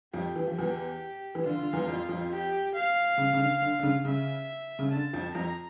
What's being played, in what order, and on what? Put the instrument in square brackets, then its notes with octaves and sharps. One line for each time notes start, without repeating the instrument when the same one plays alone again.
[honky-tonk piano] F2 F3 [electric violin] G4
[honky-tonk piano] E3
F3
[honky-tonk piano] E2 E3 [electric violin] G4
[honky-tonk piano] E3
[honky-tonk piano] D3 [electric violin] F4
[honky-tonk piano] D3
E2 E3
F2 F3
F2 F3
[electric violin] G4
F5
[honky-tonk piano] C#3
C#3
D3
D3
D3
C#3
[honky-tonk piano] C#3 [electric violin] E5
[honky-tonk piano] C#3
[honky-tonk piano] D3 [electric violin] A5
[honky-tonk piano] F2 F3
[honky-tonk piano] F2 F3 [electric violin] A#5